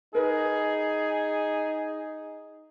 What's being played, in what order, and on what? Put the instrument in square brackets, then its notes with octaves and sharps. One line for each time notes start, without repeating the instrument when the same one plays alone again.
[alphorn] D#4 [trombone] G#4 [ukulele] A#4 B4